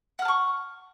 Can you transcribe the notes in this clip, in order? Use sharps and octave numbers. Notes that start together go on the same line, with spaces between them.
F#5 A5 C#6 F6